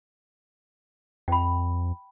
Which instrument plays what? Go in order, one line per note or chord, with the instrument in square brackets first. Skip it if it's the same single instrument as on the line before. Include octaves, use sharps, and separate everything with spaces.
[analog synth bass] F2 [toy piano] G5 B5